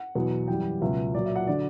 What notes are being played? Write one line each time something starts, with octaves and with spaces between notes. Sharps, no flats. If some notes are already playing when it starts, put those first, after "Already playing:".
Already playing: F#5
E2 B2 F#3
F#2 E3 G3 G5
C#2 B2 F#3 E5
A#2 F#3 D5
E5
F#5
D3 F#3 D5